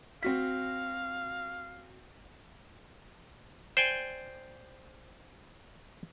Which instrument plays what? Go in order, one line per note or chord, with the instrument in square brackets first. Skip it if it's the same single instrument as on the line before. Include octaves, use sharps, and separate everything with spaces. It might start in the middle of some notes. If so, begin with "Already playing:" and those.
[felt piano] C4 F#4 B6 [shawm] F5
[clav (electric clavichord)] C5 D5 G5 G#5